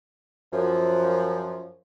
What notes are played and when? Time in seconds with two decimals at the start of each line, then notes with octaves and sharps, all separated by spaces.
0.53 F#2 F3